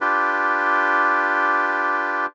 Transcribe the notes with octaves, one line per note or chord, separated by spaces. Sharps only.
D4 F4 G4 B4